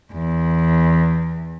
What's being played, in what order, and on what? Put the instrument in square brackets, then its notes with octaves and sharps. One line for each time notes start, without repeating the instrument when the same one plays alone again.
[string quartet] E2